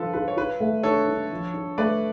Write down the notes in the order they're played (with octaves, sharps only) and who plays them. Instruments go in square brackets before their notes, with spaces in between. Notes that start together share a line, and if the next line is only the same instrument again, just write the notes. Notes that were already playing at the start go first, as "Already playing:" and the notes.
Already playing: [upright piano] D3 F3 F4 [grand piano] A4 B4
[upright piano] F4 [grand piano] B4
[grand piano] C#5
[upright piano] F4 [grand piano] B4
[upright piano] A3
[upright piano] D4 [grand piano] A4 C#5
[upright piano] D4
F3
D4
[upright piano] A3 [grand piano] B4 D5